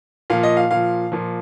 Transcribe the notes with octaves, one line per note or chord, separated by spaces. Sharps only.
A#2 F3 F5
D#5
F5
A#2 F3 F5
A#2 F3